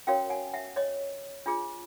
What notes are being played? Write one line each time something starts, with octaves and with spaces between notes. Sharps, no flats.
C#4 F#4 A#4 C#5 F5 G5
F#5 G#5
E5 F#5
C#5 D#5
D4 F4 G#4